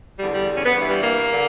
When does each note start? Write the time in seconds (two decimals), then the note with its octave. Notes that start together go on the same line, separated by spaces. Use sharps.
0.19 E2 D3 G3
0.33 G3
0.56 C#4
0.66 B3
0.75 G2 E3
0.89 G3
1.03 A#3
1.31 D3